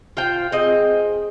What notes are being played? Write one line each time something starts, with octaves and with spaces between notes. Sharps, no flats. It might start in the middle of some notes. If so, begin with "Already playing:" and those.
F4 C5 G5
C4 G#4 D#5